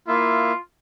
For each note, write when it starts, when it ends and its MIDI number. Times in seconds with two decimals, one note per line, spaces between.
0.08 0.52 58
0.08 0.52 64
0.08 0.56 65
0.08 0.52 76